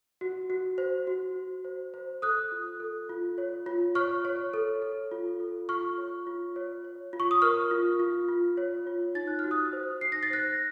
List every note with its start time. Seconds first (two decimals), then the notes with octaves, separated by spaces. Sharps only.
0.21 F#4
0.50 F#4
0.78 C5
1.07 F#4
1.36 F#4
1.65 C5
1.94 C5
2.22 A4 D#6 F#6
2.52 F4
2.80 A4
3.09 F4
3.38 C#5
3.66 F4
3.95 C#5 C#6 F6
4.25 C#5
4.54 A4
4.82 A4
5.11 F4
5.40 A4
5.69 F4 C#6 F6
5.98 C#5
6.27 F4
6.56 C#5
6.84 C#5
7.13 F4
7.20 C#6
7.31 D#6
7.42 A#4 C#6 F6
7.71 F4
8.00 F4
8.28 F4
8.57 C#5
8.87 F4
9.15 D#4 A6
9.27 F#6
9.39 F#4 F6
9.51 D#6 F#6
9.73 C5
10.01 D#4 C7
10.12 A#6
10.23 A6
10.30 C5 F#6 A#6